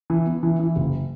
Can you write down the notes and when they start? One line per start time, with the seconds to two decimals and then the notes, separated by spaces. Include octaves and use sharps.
0.10 E3
0.26 B3
0.43 E3
0.59 E3
0.76 F#1